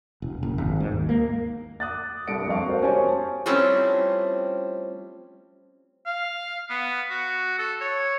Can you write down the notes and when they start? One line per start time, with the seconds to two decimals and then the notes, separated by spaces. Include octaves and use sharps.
0.22 E1
0.43 F#1
0.58 G#1
0.80 G#2
0.92 D#2
1.09 A#3
1.80 D6 D#6 F#6 A6
2.27 C2 G2 A4 C#7 D7
2.48 F2 D#5 F5 C#6
2.66 F#4 A#4 C5
2.82 C#4 G4 C5 G#5 A5 C#6
3.46 F3 G3 A3 C4 C#4 E4
6.06 F5
6.70 B3
7.10 F#4
7.58 A4
7.81 C#5